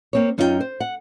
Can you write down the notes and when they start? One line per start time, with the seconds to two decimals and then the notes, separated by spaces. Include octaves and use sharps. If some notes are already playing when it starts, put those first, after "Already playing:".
0.13 A#3 C4 C#5
0.38 F#2 C#4 D#4 F4 A#4 G5
0.60 C5
0.80 F#5